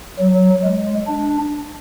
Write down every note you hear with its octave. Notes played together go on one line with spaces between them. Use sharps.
F#3
G#3
D4